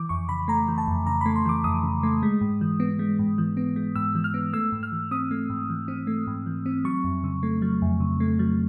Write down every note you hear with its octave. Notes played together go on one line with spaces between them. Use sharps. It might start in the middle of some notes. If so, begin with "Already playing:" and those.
Already playing: E3 D6
F2 C#6
C#3 B5
A3 A#5
E3
A5
F2
C#3 A#5
A3 B5
C6
E3 D6
F2 D#6
C#3
A3
G#3
G#2
E3
B3
G#3
G#2
E3
B3
G#3
G#2 E6
E3
F6
B3
A3 E6
G#2
F6
E3
C4 D#6
A3
G#2
E3
C4
A3
G#2
E3
C4
F#3 C#6
F2
C#3
A3
F#3
F2
C#3
A3
F#3